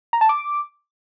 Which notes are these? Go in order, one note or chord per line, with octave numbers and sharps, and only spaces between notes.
A#5
A5
D6